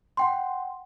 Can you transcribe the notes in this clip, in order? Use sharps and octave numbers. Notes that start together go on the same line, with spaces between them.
F#5 G5 C6